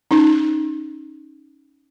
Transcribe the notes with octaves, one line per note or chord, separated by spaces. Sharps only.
C#4 D#4